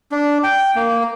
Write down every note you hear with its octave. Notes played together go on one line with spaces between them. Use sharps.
D4
G5
A#3